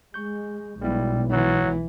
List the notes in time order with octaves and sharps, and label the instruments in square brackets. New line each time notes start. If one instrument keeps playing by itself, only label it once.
[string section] G#3 [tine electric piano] C#6 G6
[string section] B1 [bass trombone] G3 [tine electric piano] G#3 B3 E4
[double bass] E3 [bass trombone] F#3